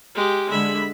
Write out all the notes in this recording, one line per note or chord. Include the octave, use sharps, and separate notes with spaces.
G#3 G4
D3 G#3 E5 B5